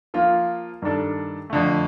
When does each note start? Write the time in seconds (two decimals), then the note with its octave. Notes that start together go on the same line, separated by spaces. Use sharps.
0.14 F3 A#3 F4
0.82 G2 D#3 G3 D4 A4
1.50 F2 D3 A3